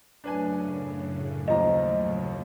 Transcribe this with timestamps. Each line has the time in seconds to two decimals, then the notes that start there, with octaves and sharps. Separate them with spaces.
0.24 F#2 A2 C#3 D4 B4 G#5
1.48 D#2 F3 D#5 A#5